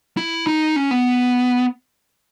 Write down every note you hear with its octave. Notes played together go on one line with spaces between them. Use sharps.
E4
D#4
C#4
B3